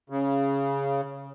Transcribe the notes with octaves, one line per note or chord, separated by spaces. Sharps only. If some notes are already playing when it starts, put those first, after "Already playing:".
C#3